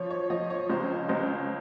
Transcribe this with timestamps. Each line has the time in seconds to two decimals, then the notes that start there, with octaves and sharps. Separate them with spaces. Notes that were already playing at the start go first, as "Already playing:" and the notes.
Already playing: F3 C#5
0.10 C#5
0.30 F3 D#5
0.50 C#5
0.70 C#2 C5
1.09 C#2 C5